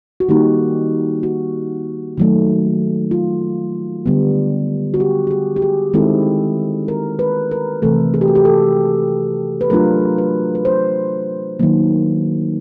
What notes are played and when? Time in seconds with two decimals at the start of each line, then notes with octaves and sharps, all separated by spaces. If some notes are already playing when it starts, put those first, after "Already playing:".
0.20 F#4
0.28 D#3 G3 A#3 D#4 G4
1.23 F#4
2.18 D#3 F#3 A3
3.11 F4
4.06 D3 G3 B3
4.94 F#4
5.00 G4
5.27 G4
5.31 G#4
5.56 G4
5.62 G#4
5.93 D#3 G#3 C4 E4 A4
6.88 A#4
7.19 B4
7.51 A#4
7.82 C3 E3 A3 A4
8.14 G#4
8.21 G4
8.28 F#4
8.35 G4
8.45 A4
9.61 B4
9.70 F#3 A3 D4 F4 A#4
10.18 B4
10.55 B4
10.65 C5
11.60 D#3 F#3 A#3